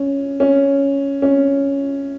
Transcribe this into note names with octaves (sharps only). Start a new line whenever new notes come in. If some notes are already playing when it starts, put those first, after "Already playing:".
Already playing: C#4
C#4
C#4